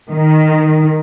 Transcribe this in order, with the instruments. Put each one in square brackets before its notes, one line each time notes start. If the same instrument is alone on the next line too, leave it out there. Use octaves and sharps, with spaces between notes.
[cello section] D#3